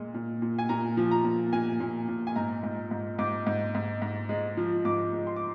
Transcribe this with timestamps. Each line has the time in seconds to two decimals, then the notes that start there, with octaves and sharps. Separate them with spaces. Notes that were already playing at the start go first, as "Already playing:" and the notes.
Already playing: A#2 G#3
0.14 A#2
0.42 A#2
0.58 G#5
0.69 A#2 A#5
0.97 F3
1.11 A#5
1.24 A#2
1.53 A#2 G#5
1.80 A#2
2.08 A#2
2.27 G#5
2.36 G#2 A#5
2.63 G#2
2.91 G#2
3.19 G#2 D6
3.47 G#2
3.75 G#2
4.02 G#2
4.29 G#3
4.57 F3
4.85 G#2 D6
5.13 G#3
5.27 C6
5.36 D6